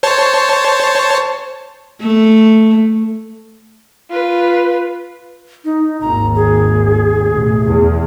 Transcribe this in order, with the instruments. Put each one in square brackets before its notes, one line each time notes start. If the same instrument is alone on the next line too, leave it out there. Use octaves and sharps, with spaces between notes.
[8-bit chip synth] C5 C#5 A5
[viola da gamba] A3
[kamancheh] F4 B4
[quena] D#4
[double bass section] G#1 D#2 [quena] A#5
[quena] G#4
[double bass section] A1 B2
E2